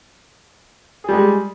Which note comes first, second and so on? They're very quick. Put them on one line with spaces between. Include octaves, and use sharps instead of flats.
G#4 G3 G#3